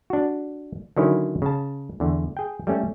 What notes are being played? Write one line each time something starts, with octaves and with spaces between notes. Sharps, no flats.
D4 F#4
D3 D#3 F#3 C#4 E4
C#3 A5
E2 D3
G#4 G5
G3 A3 C#4